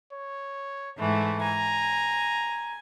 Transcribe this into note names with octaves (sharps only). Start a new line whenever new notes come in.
C#5
G#2 E3 A3
G#5 A#5